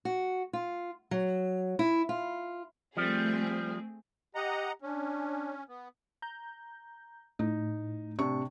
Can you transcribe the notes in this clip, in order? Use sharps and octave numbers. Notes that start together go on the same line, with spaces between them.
F#4
F4
F#3
E4
F4
F3 G3 A3 C4 G#4
G4 D#5 F#5 A#5
C#4 D4
B3
A#5 G6
A2 D#4
C3 D4 C#6